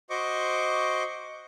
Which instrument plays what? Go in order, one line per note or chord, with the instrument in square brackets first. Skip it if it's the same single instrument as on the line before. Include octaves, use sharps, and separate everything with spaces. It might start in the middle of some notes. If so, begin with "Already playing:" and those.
[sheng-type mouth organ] F#4 C5 D#5 C#6 D6